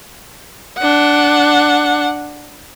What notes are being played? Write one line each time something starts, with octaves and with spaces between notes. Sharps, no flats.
D4 F#5